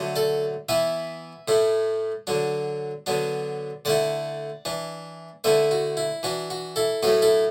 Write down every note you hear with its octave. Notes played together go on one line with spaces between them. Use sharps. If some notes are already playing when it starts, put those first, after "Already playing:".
Already playing: D3 F#3 A3
A4 D5
E3 B3 E4 B4 E5
A2 A3 E4
D3 F#3 D4
D3 F#3 B3 D4
D3 A3 E4 D5 F#5
E3 D4
D3 A3 E4 B4 E5
F#4
E4
E3 D4 F#4
F#4
E4 A4
A2 F#3 A3 F#4 B4
E4 A4